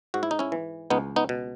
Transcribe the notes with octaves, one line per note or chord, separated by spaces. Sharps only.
G#2 F#4
E4
D#4
C#4 E4
E3
C#2 B3 D#4
B3 D#4
B2